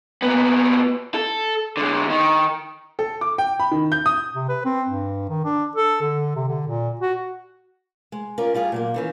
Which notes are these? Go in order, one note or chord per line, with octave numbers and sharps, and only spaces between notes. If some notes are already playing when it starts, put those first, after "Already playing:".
A#2 B3
A4
D3 G#3
D#3
A4
D6
G5
B5
D#3
G6
D#6
C3
B4
C4
G2
D#3
D4
A4
D3
C3
D3
A#2
F#4
G#3
C#4 F4 A#4 D5
G3 F4 G#4 D5 D#5
A#2 F#3 A#3
D#3 E3 C#4